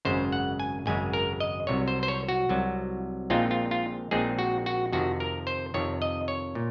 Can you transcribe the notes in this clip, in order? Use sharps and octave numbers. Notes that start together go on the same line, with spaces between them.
G#1 F#2 C#3 G#3 C5
F#5
G#5
G#1 F#2 C#3 G#3 G#5
A#4
D#5
C2 C3 F#3 C#5
C5
C5
C#5
F#4
C2 C3 F#3
A#1 A#2 G#3 C4 D#4 F4
F4
F4
A#1 A#2 G#3 C4 D#4 G#4
F#4
F#4
F2 C3 D#3 F#4
A#4
C5
F2 C3 D#3 C#5
D#5
C#5
A#2